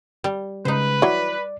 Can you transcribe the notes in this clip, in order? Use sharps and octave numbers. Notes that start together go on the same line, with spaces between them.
G3
C#3 G#3 D#4 B4 C5
E3 F#3 D5